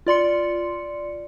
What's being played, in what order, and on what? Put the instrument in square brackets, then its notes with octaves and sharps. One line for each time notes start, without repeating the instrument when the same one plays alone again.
[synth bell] F4 D5 C6 C#7